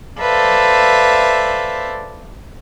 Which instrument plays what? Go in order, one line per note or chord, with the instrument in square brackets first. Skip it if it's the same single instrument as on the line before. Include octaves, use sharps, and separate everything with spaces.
[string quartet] A4 B4 C5 D5 E5 F5